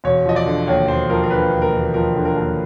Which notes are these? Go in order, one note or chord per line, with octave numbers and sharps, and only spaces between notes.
E1 C#5
F3 D#5
D5
D3
D#2 C#5
E1 C5
F3 A#4
A#4
D3 B4
D#2
A#4
E1
F3 A#4
D3
A#4
D#2